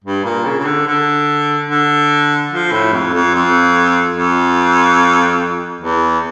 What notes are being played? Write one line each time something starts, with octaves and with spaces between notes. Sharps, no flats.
G2
A#2
C#3
C#3
D3
D3
D3
F3
A2
F2
F2
F2
F2
E2